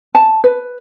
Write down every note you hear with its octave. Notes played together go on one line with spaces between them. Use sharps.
A5
B4